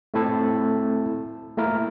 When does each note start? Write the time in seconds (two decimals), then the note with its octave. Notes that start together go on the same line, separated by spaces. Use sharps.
0.14 A3 C4 E4 A4
1.57 A3 A#3 E4 A#4